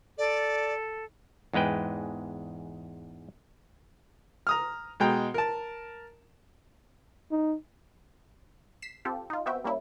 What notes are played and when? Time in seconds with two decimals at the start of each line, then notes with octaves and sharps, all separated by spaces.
0.18 A4 D5
1.53 E2 G#2 G#3 B4 G5
4.47 A#5 D#6 F6
5.00 B2 G#3 G5 A#5
5.34 A#4 A5
7.31 D#4
8.82 B6 C7 E7
9.05 C4 F4 G4 A4
9.30 D#4 F4
9.46 B3 C4 F#4 E5 G5
9.64 G3 A#3 C#4 E4